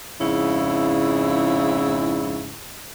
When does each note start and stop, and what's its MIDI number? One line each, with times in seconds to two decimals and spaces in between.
0.19 2.56 41
0.19 2.56 44
0.19 2.56 49
0.19 2.56 64